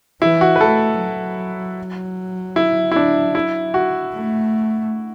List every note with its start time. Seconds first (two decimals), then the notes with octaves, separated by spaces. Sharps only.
0.22 E3 E4
0.41 F#4
0.56 B4
0.61 A3 A4
1.00 F#3
2.56 E4
2.92 E4
2.96 D4
3.35 E4
3.74 F#4
4.14 A3